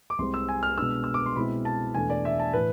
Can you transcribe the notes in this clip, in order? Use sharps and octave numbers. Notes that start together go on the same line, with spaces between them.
D6
C2 C3 G#3 C4 C6
E6
G#5
F6
B2 G#3 B3 D4 E6
E6
D6
C6
B2 G#3 C4 E4 B5
A5
E2 B2 A3 D4 G#5
D5
E5
A5
A2 E3 B4